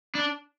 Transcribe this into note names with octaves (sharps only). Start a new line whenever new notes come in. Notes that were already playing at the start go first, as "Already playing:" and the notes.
D4